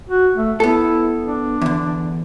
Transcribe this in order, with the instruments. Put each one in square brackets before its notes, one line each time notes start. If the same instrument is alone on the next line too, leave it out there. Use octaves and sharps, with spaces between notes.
[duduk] F#4
A3
[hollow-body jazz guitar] B3 A4 [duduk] E4
[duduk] D4
[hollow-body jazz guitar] E2 D3